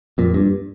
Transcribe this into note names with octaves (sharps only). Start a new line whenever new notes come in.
F2 A#2
G2